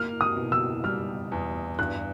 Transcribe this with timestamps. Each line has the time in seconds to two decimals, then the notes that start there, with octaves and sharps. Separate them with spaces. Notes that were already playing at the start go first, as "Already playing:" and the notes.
Already playing: A#3 F6
0.21 D#6
0.36 B2
0.52 E6
0.84 G3 F6
1.32 E2
1.78 G2 F#6